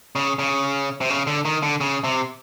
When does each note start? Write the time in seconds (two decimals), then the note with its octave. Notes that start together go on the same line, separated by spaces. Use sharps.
0.16 C#3
0.39 C#3
1.01 C3
1.10 C#3
1.27 D3
1.45 D#3
1.62 D3
1.81 C#3
2.04 C3